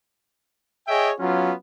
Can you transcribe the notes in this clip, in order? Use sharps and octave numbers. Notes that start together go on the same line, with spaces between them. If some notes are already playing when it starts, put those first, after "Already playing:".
G#4 C#5 D#5 E5 G5 G#5
F#3 B3 C#4 F4